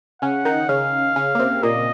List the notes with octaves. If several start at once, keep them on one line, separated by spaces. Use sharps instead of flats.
C#3 C#4 F#5
D#3 D#4
C#3 C#4 F5
C#3 C#4
A#3
C3 C4
A#2 A#3 D#5